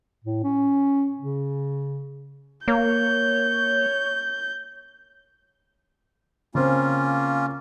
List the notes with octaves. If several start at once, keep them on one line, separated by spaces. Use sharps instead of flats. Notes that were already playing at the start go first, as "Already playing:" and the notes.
A2
C#4
C#3
A#3 C#5 G6
C#3 A#3 C4 C#4 F4